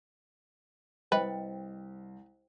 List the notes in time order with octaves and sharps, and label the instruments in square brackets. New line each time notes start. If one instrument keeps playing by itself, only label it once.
[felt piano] C2 [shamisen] B4 [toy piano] C5 D#5 G5